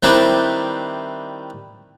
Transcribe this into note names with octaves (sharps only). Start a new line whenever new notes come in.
D#3 G3 C4 D4 E4 B4